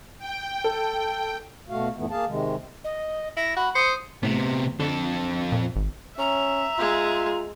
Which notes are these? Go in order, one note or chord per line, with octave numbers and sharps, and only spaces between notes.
G5
A4
B2 A3 F#4 F5
F#2 A#2 E3 A3 B3
A#3 G#4 F5 A5
C3 D#3 G#3
D#5
E4 A#6
F#4 B5
C5 D#6 C#7
A2 C3 B3
F2 D3 A4
A#2
G#1
C#4 E5 A#5
G#3 F4 G#4